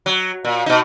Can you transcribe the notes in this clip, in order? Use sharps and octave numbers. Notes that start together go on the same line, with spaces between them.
F#3
A#2
B2 D#4